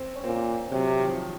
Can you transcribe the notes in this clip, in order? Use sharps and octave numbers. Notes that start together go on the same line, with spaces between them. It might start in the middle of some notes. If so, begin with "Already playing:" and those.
Already playing: C4
C#4
A#2 C4
C3 F#3
F#3
D#3
F3
D#3